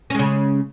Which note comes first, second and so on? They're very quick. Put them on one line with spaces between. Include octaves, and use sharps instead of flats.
C#4 G#3 C#3